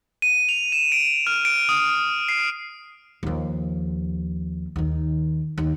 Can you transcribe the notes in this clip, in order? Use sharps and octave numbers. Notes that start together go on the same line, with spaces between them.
D#7
F7
E7
D7
F6
D7
D#6
C7
D#2 F3
D#2 D#3
D#2